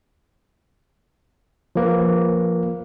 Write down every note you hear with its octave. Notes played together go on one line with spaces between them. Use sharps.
F3 A#3 B4